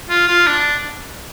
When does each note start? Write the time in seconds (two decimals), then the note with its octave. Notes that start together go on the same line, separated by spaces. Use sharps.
0.09 F4
0.28 F4
0.47 D4